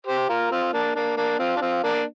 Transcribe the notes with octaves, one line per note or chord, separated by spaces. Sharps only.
G4 C5
F4 A#4
C4 F4
A#3 D4
A#3 D4
A#3 D4
C4 F4
D4
C4 F4
A#3 D4